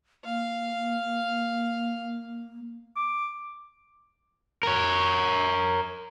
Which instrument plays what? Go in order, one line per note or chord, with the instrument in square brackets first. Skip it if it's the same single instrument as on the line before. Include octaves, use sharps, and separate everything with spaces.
[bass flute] A#3 [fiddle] F5
[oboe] D6
[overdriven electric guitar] A#4 C#5